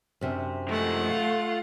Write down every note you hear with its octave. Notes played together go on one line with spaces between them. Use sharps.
F#2 C3 D4
D#3 F3 G#3 A3 F#5
F4